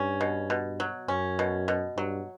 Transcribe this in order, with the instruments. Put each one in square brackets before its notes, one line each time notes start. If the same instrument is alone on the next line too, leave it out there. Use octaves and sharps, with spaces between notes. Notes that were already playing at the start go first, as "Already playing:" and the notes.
Already playing: [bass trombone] G2 [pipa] C#4
[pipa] B2
B2
F#3
[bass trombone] F#2 [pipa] C#4
[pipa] B2
B2
[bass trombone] G2 [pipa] F#3